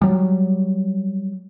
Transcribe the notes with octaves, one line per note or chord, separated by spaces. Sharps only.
F#3 G3